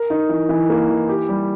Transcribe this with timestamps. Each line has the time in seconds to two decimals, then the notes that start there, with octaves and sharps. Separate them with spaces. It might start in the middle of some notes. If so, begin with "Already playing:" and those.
Already playing: A#4
0.10 D#4
0.29 E3
0.49 E3
0.70 A#3
0.90 E3
1.09 G4
1.29 G3